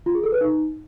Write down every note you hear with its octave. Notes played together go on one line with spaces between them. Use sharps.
F4
G#4
A4
B4
D#4